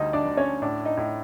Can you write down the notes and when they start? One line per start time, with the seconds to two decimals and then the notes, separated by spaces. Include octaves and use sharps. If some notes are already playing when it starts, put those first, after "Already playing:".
Already playing: D2 G3 D#4 D#5
0.13 D4 D5
0.25 D2
0.37 C#4 C#5
0.62 A2 D4 D5
0.85 D#4 D#5
0.97 A2